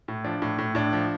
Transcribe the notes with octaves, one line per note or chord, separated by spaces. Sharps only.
A2
F3 D4
A2
A2
A2 D4
F3